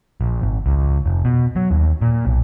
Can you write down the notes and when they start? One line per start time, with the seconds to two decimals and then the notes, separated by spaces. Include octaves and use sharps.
0.21 A#1
0.42 G#1
0.66 C#2
1.06 F1
1.25 B2
1.56 F#3
1.71 D#2
2.02 A#2
2.25 B1